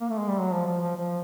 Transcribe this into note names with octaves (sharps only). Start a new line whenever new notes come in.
A#3
A3
G#3
G3
F#3
F3
F3
F3
F3